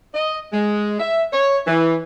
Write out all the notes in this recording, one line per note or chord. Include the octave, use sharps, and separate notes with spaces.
D#5
G#3
E5
C#5
E3